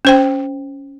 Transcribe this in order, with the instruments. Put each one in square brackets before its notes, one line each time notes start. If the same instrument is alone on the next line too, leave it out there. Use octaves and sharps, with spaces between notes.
[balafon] C#4 C5 G5